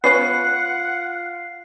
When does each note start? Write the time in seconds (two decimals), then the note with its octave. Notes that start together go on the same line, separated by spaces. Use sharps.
0.04 B3 C#4 F4 B4 F#5 C7